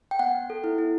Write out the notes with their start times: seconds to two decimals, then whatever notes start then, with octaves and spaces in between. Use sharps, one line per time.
0.11 G5
0.19 B3 F#5
0.35 B3
0.50 A4
0.64 E4
0.78 E4